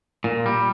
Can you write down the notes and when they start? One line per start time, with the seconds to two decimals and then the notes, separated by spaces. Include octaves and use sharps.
0.24 A#2
0.46 G3